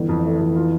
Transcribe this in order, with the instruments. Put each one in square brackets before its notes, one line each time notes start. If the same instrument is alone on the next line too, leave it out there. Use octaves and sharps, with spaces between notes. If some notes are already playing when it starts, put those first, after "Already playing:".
Already playing: [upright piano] G1 [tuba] E3
[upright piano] F2
A3
F2
F4